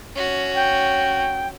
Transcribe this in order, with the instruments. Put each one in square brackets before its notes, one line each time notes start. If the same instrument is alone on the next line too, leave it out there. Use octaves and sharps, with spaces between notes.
[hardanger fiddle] C#4 F#4
[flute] G5